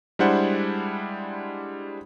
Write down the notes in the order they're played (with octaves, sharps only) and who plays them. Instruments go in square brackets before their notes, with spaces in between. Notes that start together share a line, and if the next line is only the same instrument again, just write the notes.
[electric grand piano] G3 G#3 D4 E4 C5 F#5